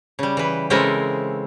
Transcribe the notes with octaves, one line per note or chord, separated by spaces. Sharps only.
C#3 G3
E3 B4
C#3 G#3 C4 E4 A4 A#4